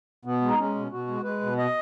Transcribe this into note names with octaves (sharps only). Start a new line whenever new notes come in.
B2 B3
G#3
D#4
G#3 C#4
B2
B2 F#4
G#3
G#3 B4
B2
D#5